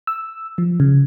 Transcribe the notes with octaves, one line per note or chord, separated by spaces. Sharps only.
E6
F3
C#3